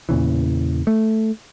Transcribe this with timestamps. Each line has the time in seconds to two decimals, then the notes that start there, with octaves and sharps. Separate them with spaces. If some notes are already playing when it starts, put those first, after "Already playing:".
0.09 E2 A#2 C#3 E3
0.87 A3